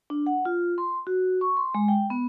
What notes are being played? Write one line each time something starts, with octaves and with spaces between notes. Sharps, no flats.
D4
F#5
F4
C6
F#4
C#6
C6
G#3
G5
B3